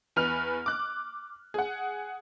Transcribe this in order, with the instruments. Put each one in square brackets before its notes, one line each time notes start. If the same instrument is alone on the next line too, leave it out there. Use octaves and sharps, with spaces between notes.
[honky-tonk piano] E2 B4 F6 F7
D6 F#6
G#4 F#5